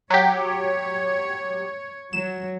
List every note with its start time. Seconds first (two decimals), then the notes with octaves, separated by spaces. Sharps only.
0.10 F#3 G4 C#5
2.13 F#3 E7